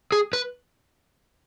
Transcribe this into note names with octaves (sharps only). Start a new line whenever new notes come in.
G#4
B4